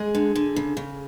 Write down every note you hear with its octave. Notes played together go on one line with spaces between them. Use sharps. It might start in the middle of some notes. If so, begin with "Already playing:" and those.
Already playing: G#3 G#4
D3
D3
C#3
C#3